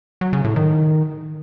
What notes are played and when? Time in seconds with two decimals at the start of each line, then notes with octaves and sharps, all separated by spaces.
0.21 F#3
0.33 C#3
0.44 A2
0.56 D#3